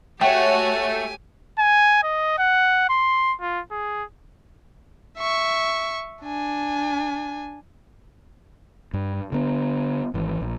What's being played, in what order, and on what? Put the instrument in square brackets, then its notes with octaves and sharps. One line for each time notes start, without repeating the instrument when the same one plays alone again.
[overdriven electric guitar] A3 [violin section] F#4 C#5 [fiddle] G4 G#5 [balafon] G5
[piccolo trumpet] G#5
D#5
F#5
C6
F4
G#4
[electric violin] E5 C#6
D4 G#5
[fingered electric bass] G2
D3 B3
G#1 E3
A#1